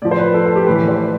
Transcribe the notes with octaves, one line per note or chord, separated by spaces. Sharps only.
A2 F3 D5
C5
B4
A4
A4
G4
A2 E3 B4
C5